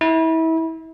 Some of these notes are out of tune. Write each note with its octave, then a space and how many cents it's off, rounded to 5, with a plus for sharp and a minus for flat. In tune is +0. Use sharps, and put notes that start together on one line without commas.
E4 -30